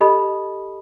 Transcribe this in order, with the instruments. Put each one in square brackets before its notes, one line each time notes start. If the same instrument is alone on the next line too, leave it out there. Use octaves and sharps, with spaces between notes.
[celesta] G4 A4 D#5 A5 B5 D#6